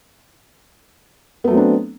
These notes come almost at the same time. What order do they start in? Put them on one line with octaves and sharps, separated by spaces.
B3 A3 F#3 C4 D4